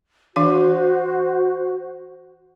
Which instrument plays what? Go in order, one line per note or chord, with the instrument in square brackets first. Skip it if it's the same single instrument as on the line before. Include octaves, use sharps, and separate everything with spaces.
[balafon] E3 D4 F5 [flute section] F#4 C5